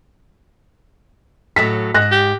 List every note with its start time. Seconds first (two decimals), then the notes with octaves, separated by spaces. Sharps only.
1.56 A2 F#3 A4 B6
1.94 G#2 F#6 A#6
2.12 G4